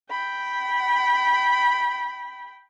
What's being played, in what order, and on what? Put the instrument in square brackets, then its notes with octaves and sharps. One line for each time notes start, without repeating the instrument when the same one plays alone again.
[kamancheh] G5 B5